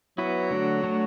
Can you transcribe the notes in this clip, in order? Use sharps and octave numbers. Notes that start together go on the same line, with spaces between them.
F#3 B3 E4 B4
D3 A3 D4 F#4
A3 D4 F#4 C#5